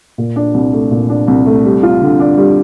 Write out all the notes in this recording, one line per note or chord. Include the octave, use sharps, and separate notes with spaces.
A#2
D4
C2
A3
A#2
D4
C2
A3
G3
F4
D3
D4
G3